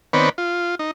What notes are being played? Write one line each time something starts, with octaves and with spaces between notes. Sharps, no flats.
D#3 B3 C4 B4 C#5 D5
F4
D#4